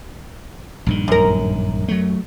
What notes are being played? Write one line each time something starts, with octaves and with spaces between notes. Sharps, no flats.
A#1 G2 D#3
F#2 A#4
F#3 A3